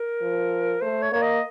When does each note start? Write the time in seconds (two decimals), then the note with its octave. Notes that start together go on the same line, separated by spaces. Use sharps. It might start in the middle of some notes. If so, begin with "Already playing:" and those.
Already playing: A#4
0.21 F3
0.82 A3 C5
1.02 C#5
1.12 A#3 C#5
1.22 D#5